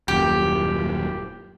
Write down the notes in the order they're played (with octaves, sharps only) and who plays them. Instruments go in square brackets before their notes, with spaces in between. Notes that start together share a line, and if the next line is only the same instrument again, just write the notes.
[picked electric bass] D#1 F#2 A#2 [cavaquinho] G4